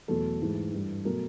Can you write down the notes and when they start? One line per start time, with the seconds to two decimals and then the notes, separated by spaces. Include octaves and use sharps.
0.08 E2 B2 F#3 A3 A4
0.41 G#2 E3 A3
0.73 G2 E3 G3
1.05 B2 F#3 A3 A#4